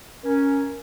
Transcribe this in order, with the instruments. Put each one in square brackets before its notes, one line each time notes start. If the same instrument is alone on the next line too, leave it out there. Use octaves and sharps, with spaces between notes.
[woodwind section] C#4 [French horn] A#4